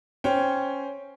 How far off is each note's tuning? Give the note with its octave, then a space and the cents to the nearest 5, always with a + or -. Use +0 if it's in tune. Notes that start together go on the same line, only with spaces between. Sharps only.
C#4 +0 C5 +0 G5 +0